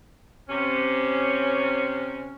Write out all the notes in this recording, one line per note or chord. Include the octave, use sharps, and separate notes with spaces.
C3 C#4